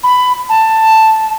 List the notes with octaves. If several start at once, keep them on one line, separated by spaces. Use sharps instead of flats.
B5
A5